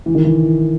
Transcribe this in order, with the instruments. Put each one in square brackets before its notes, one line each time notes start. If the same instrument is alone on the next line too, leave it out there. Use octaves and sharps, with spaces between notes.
[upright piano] E3
D#3
E3